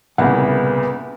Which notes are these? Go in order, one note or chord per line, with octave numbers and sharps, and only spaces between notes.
C2 A#2 C#3 B3 F#5